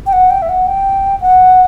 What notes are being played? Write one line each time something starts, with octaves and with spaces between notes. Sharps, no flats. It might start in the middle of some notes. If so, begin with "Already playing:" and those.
G5
F#5
G5
E5
F#5
G5
F#5